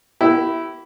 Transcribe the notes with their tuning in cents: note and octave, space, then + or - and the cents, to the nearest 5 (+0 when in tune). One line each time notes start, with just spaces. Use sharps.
E4 +0 G4 -30